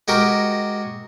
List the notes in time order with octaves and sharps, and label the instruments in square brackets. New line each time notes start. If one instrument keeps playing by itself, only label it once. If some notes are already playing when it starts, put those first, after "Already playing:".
[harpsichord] G#3 F#4 G4 A#4